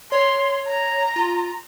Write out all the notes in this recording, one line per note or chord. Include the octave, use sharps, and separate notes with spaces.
C#5 C6
A#5
F4